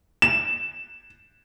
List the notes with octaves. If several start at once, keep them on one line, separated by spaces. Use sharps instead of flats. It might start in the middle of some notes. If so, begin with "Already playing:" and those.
E7